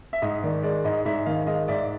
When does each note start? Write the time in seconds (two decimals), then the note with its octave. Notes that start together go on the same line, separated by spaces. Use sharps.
0.13 E5
0.22 G#2 D#5
0.43 D#3 D5
0.63 G#3 D5
0.85 G#2 D#5
1.05 G#2 D5 E5
1.26 D#3 D#5 F5
1.47 G#3 D#5 F5
1.68 G#2 D5 E5